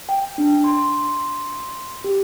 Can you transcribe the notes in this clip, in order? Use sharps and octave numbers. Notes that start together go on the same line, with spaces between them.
G5
D4
C6
G4